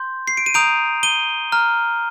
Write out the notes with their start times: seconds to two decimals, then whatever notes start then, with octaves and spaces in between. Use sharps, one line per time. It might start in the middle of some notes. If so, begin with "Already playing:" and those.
Already playing: C6 G6
0.28 C7
0.37 D7
0.46 D#7
0.54 A#5 D#6 G6 D7 F7
1.03 D#7 G7
1.52 A#5 F6